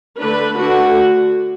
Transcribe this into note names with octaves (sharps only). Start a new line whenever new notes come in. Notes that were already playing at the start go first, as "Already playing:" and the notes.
D3 A3 D4 B4
D3 A3 D4 F#4